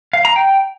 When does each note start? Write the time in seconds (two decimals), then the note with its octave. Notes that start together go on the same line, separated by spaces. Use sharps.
0.13 F5
0.25 A#5
0.36 G5